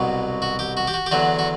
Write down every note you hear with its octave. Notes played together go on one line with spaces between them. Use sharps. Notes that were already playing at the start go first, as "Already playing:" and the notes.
Already playing: C2 B2 F#3
F#4
G4
F#4
G4
F#4
G4
E2 D3 F#3 F#4
F#4